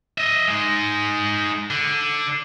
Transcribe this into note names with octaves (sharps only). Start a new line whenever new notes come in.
D#5 E5
G#3 D#4
D3